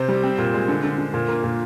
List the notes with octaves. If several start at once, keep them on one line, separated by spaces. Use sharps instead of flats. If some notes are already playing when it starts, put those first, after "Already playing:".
Already playing: C3 C5
G3
C4
A#2
G#3
D3
D3
D3
A#2
A#3
A#2